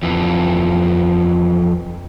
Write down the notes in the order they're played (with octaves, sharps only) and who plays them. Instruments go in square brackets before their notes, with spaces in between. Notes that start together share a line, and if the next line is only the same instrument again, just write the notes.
[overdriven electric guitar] F2 E3